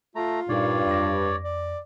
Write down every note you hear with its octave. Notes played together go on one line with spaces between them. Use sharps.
A3 F4 A#5
G2 A#2 D#4 A#4 C#5 D5
F2 D6 A#6
D5